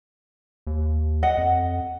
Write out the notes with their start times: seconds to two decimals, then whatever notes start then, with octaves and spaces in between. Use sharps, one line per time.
0.67 D#2
1.23 D#5 F#5
1.38 F2